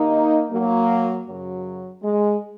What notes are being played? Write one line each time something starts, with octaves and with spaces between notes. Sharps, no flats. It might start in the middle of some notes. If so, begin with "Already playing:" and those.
Already playing: D#2 D#3 A#3 D#4
F#3 A#3
F#2 C#3 F#3
G#3